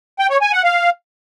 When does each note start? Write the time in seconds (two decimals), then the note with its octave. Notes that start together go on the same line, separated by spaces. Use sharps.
0.19 G5
0.30 C#5
0.41 G#5
0.53 F#5
0.64 F5